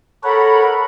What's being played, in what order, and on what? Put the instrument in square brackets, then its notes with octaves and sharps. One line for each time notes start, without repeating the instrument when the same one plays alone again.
[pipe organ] A4 C#5 F#5 [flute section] A#4 B5